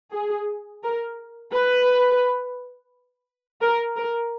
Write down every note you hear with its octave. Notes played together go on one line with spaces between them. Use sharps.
G#4
A#4
B4
A#4
A#4